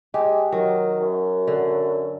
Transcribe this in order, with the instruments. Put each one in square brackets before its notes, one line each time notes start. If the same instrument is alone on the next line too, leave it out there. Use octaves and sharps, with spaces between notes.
[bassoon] G#3 [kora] G4
[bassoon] D#3 [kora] F#3
[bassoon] F#2
[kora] D3